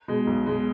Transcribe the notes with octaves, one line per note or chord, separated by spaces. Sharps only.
B2 G#3
B1
B2 G#3